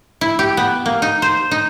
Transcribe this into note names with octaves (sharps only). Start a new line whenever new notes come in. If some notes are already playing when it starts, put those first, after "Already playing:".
E4
G4
B3
A#3
D#4
C5
D#4